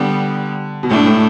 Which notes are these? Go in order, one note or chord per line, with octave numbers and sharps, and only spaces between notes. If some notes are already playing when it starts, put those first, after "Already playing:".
Already playing: D3 G3 B3
B2
A2 A3 D4
A2